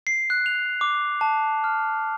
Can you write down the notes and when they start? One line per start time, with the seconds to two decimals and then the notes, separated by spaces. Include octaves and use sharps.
0.07 C7
0.30 F#6
0.46 F7
0.81 D6
1.21 A5
1.64 F6